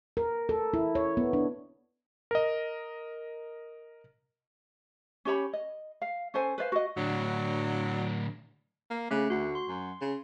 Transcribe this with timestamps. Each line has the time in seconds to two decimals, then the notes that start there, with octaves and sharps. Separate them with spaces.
0.17 A#4
0.49 A4
0.74 E4
0.95 C#5
1.17 B3
1.33 D4
2.31 A#4 D#5
5.25 C#4 G4 C#5 B5
5.53 D#5
6.02 F5
6.34 C#4 A4 C5 G#5
6.58 B4 C5 D5 F5
6.72 F#4 D#5
6.97 A2 D3 F#3 D4
8.90 A#3
9.11 C#3 A3 F#6
9.30 D2 F#4
9.55 C6
9.68 F#2
10.01 C#3